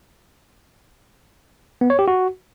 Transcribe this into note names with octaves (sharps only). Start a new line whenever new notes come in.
B3
C#5
G4
F#4